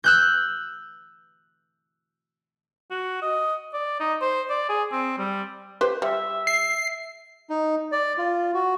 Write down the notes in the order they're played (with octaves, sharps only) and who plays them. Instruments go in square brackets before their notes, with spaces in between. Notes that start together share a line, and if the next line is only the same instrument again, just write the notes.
[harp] E6 F#6 G6
[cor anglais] F#4
D#5
D5
D#4
C5
D5
G#4
C4
G3
[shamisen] G4 B4 C5
[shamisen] G3 [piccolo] E5
[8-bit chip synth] C7
[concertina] D#4
D5
F4
F#4